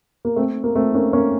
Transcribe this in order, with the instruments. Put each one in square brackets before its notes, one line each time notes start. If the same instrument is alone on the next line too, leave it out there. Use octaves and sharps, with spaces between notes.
[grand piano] A#3
A3 C4
A#3
A3 C4
A#3 C#4
A#3 C#4